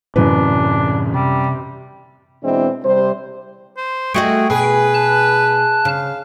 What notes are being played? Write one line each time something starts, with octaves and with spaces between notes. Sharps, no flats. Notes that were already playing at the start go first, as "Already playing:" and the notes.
F#2 A2 C3 E3 D4 B4
C3 G3
B2 E3 G#3 C4 D4 E4
C3 G3 C5
C5
A3 F#4 G#4 D#5 G5
B2 G#4 B4
A5 F#6
C#3 F5